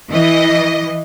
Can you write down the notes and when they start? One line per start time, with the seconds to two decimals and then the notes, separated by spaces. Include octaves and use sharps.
0.11 E3 D#5